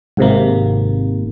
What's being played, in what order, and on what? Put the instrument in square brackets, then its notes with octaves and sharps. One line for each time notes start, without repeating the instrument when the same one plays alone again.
[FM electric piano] G#1 G#2 C3 A#3